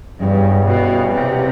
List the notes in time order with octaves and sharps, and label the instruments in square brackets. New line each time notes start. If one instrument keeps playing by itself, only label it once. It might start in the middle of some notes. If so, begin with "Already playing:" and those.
[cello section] G2 [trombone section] C#3 E3 G3 B3
[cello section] B2
C3